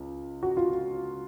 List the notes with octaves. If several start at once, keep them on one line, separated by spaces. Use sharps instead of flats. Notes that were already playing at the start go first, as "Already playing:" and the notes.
Already playing: C#2
F#4
F4